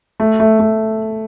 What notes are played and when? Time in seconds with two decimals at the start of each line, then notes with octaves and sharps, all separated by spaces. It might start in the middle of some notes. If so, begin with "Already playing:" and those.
0.20 A3
0.40 A3
0.59 A3